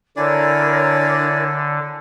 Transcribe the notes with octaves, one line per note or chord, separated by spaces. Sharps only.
D3 D4 E4 A#4 C#5 D5 G#5